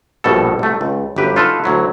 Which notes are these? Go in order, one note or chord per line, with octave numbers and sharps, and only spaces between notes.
A#1 G2 B2 G3 A4
C2 A3
C#2
G1 F#2 G4 B4
D#4 F4 F#4 A4 B4
D2 F#3 E4